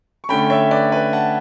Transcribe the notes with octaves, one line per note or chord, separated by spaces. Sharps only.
C#6
D3 A3 C#4 G5 B5
C#5 E5
B4 D5
B4 D5
F#5 A5